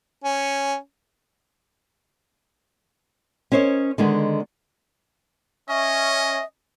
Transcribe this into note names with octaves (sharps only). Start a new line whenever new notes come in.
C#4
C#4 A#4 C5 C#5 D#5
D3 D#3 G#3 B3
C#4 D#5 E5